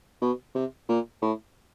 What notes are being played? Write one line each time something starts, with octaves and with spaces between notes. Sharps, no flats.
B2
C3
A#2
A2